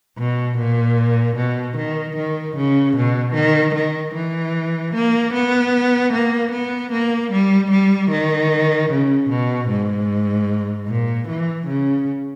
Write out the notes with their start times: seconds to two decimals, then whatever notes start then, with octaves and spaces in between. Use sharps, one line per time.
0.17 B2
0.57 A#2
1.36 B2
1.76 D#3
2.15 D#3
2.56 C#3
2.96 B2
3.34 D#3
3.74 D#3
4.14 E3
4.94 A#3
5.33 B3
6.13 A#3
6.51 B3
6.91 A#3
7.31 G3
7.71 G3
8.10 D#3
8.90 C#3
9.29 B2
9.69 G#2
10.87 A#2
11.27 E3
11.66 C#3